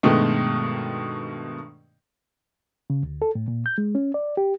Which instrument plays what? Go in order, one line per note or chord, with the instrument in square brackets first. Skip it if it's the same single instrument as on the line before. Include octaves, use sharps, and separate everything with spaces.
[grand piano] G2 B2 D#3 G#3 A3
[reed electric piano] C#3
D2
A4
A2
A#2
G6
G#3
C#4
D5
G4